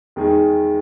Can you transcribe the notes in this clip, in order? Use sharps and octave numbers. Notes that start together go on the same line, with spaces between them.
E2 D#3 G#3 D#4 G#4